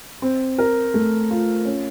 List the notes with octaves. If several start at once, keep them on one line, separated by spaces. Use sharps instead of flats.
C4
A#4
A3
F4
C#4